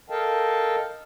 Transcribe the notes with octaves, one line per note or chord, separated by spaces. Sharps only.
A4 A#4 D#5 F5 G5 A5